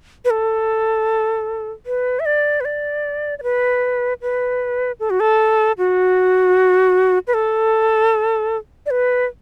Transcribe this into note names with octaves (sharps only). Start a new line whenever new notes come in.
B4
A4
B4
E5
D5
B4
D5
D5
B4
B4
A4
F#4
A4
F#4
B4
A4
D5
B4